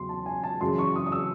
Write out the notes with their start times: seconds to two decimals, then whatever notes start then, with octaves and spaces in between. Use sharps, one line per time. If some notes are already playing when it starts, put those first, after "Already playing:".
Already playing: E2 C#3 F#3 C6
0.09 A5
0.26 G#5
0.43 A5
0.61 F#2 C#3 E3 C6
0.78 C#6
0.96 D#6
1.06 D#6
1.12 E6